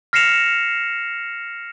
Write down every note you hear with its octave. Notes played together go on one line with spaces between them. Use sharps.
F6 A#6 C7 C#7 E7 F7